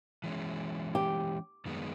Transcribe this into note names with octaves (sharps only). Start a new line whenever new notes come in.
E3 G#3 C#4
G4
F#2 D#3 G#3 B3